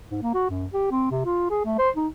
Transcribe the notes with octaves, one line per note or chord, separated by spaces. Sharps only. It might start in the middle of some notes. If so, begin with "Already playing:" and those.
G#2
A#3
F#4
F#2
G4
C4
C3
F4
G#4
A3
C5
D#4